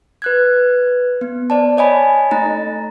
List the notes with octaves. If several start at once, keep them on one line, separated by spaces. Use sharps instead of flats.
B4 F#6 G#6
B3
C5 D5 A5
C#5 D#5 G#5 B5
A3 D#4 A#5 A6